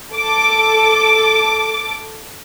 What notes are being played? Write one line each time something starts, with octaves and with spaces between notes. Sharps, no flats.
A4 D6